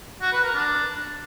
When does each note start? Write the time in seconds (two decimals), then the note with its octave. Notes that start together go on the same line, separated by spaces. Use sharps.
0.22 F#4
0.33 B4
0.43 A#4
0.54 D4